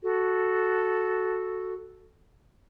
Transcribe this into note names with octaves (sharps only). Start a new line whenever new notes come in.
F#4 A4